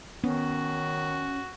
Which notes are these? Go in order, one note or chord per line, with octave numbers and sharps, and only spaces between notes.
D#3 B3 C#4 F#4